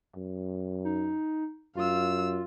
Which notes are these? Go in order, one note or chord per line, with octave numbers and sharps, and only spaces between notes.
F#2
D#4
F#2 F4 F5 E6